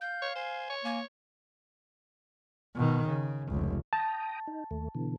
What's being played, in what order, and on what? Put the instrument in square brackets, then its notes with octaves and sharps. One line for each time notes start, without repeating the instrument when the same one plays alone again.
[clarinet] F5 [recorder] G6
[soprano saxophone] C#5
[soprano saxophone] C5 [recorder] G#5
[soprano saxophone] C#5
[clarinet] A#3 [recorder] G#5
[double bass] B2 D#3
C#3
F1 C#2
[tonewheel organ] G5 A#5 D#6 [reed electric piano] A5
[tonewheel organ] D#4
D#2 A3
B2 D3 E3